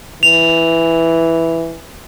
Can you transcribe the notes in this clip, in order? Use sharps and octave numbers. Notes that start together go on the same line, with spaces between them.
E3 F7